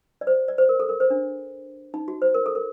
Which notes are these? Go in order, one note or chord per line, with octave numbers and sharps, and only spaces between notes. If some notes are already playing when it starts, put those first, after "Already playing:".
D5
C5
D5
C5
A#4
A4
A#4
C5
D4
D#4
F#4
C5
A#4
A4
A#4